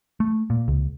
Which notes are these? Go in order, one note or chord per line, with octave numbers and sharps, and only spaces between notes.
A3
A#2
C#2